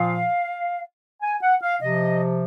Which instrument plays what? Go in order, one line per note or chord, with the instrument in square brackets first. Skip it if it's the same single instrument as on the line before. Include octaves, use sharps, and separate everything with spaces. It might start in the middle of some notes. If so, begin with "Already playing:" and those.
Already playing: [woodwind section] A#2 F3 F5
G#5
F#5
F5
C3 F3 D#5